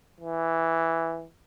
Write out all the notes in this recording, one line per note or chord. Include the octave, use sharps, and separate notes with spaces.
E3